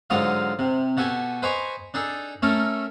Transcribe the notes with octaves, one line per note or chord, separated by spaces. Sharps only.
G#2 D3 F#3 F4 D#5 F5
C3
B2 F#4 G4 A4 G#5
B4 C5 D#5 G#5 A#5 C#6
D4 D#4 G#4 A4
A3 C#4 A4 A#4